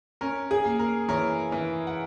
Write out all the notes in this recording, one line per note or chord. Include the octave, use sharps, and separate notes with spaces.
C#4 A#4
G#4
A#3
A#4
E3 A#4 C#5
E3
F#5